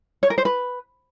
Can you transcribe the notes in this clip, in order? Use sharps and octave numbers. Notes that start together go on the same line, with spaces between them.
C#5
A#4
C5
B4